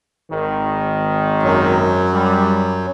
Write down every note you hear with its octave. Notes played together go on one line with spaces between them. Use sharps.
G#1 D#3
F#2 F#3
G3